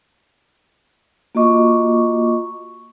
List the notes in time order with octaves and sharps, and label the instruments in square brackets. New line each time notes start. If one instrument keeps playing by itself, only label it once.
[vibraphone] A#3 F4 F#4 D#5 C#6 D6